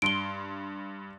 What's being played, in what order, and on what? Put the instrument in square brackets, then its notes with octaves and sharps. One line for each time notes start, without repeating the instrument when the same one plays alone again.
[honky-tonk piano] G2 C6 [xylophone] D7 G7